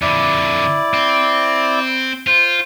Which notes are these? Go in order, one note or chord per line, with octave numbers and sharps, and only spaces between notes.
F2 D3 E4 D5
C4
F4 C5